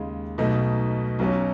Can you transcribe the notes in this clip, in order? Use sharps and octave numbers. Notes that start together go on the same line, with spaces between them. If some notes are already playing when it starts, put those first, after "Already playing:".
Already playing: D#2 C#3 G#3
B1 B2 A3 D#4
B1 B2 F#3 C#4